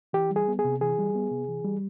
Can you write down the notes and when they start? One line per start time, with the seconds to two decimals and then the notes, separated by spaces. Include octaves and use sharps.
0.13 E3 G4
0.31 G3
0.36 G#4
0.48 B3
0.59 G#4
0.64 C3
0.81 E3 G#4
0.98 G3
1.15 B3
1.31 C3
1.49 E3
1.65 G3